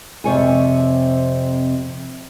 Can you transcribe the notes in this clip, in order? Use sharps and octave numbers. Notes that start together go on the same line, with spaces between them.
F2 C3 C#5 G#5